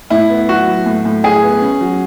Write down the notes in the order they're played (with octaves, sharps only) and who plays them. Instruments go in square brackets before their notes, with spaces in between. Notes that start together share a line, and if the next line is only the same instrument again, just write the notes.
[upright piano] A2 [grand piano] E4
[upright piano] B3
[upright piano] F#3 [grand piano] F#4
[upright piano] F#3
A2
A2
[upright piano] E4 [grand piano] G#4
[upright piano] B3
C#4
F#3